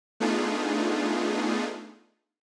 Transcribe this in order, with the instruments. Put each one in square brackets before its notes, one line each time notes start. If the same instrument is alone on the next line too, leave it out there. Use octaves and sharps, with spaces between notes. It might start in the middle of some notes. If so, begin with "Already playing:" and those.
[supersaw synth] A3 B3 D4 D#4 F4 G#4